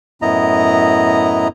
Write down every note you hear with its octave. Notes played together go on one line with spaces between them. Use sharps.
F#2 A2 B3 E4 D#5 A#5